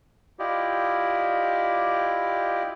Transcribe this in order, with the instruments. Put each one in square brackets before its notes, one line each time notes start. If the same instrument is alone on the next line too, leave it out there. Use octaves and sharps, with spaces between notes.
[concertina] E4 F4 G4 D5 D#5